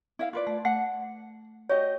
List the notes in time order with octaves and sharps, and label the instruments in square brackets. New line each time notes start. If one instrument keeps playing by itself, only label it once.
[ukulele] E4 E5 F5
F4 B4 D5
[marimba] A3
[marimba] A3 [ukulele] F#5
[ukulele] F#4 G4 D#5 [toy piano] C#5